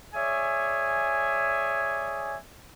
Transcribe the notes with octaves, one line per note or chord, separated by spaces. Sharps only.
G#4 C#5 D5 E5 G#5